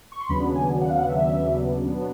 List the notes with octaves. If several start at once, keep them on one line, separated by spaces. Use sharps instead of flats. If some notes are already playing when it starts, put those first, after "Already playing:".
C#6
C6
D#2 C#3 F#3 B3 D4 B5
G#5
F#5
F5
F#5
E5
B2 F#3 B3 D4